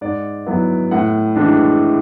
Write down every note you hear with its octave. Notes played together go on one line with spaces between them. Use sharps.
G#2 D5
F#3 B3 E4
A2 F#5
E3 G#3 D4